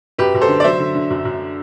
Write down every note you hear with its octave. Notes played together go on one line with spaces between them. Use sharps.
F#2 G4 B4
F#2
A4 C5
D3
D5
F#3 C5 E5
D3
D3
F#2
F#2